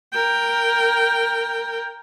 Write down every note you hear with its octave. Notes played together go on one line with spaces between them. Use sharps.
A#4 G5